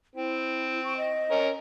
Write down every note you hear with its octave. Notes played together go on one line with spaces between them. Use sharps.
C4 E4
C#6
D#5
C#4 A#4